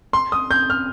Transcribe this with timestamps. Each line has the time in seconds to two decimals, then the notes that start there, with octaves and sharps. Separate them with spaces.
0.13 C6
0.32 D#6
0.51 G6
0.70 F6